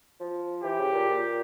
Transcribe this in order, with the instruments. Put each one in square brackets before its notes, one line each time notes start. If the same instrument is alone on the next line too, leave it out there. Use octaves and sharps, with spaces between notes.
[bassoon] F3
[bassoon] E3 [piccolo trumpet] G4
[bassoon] C#3
A#2
A#2